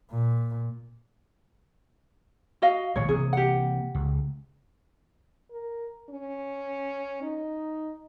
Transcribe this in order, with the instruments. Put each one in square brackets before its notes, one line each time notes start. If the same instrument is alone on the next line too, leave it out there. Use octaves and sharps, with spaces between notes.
[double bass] A#2
[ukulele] F#4 D#5 F5
[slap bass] G#1 A#2 C#3 [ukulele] C#5
[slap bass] C3 E3 A#3 [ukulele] G#4
[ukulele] G4 F#5
[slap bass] C#2
[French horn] A#4
C#4
D#4